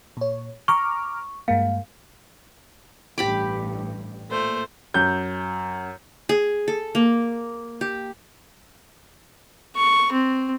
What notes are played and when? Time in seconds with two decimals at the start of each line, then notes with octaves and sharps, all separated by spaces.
0.17 A#2 C#5
0.68 A#5 C#6 D6 F6
1.48 G2 G#3 A#3 F5
3.18 A1 G2 G4 B5 D6
4.30 A#2 A3 C5
4.94 F#2 G6
6.29 G#4
6.68 A4
6.95 A#3
7.81 G4
9.76 C#6
10.12 C4